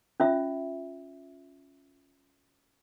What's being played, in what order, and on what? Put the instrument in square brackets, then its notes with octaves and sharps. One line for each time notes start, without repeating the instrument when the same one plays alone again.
[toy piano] C#4 F4 E5